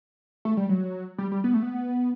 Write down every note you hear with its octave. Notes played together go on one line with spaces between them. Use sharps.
A3
G3
F#3
G3
G3
B3
A3
B3